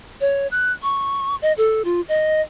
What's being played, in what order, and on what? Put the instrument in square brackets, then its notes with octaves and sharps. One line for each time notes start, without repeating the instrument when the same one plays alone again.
[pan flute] C#5
F#6
C#6
D#5
A4
F4
D#5